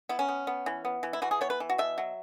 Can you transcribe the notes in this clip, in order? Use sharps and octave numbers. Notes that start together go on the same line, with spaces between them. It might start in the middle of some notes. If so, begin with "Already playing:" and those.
B3 E4
C#4
B3
B3
E3
B3
E3
E4
E3 F#4
G#4
B3 C#5
B4
E3
F#4
B2 E5
F#3